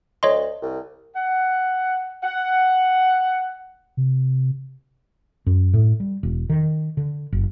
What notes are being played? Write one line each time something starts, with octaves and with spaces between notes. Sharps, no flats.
D2 C#5 D#5 C6
C2
F#5
F#5
C3
F#2
A2
G3
E1
D#3
D3
F#1